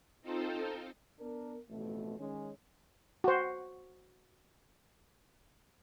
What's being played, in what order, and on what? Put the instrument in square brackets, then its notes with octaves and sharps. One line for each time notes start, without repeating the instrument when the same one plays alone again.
[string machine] C4 D#4 F4 A4 C5
[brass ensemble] B3 D4 A#4
A1 F2 B2 A3
D#3 G#3 C#4
[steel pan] F#4 C5